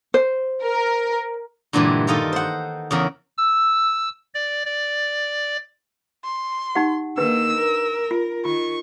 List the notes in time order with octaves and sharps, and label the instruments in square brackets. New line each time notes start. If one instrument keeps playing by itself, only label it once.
[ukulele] C5
[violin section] A#4
[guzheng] G2 A#2 D3 E3 G3 G#3
D#3 D#4 F4 A4 D#5
C5 F#5
E2 C#3 A#4 E5
[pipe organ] E6
D5
D5
[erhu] C6
[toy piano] D#4 G4 F#5
[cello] D#3 A#3 [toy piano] D4 G#4 B4 [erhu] E6
[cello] A#4
[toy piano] F4
[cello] D#3 [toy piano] F4 [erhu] C#6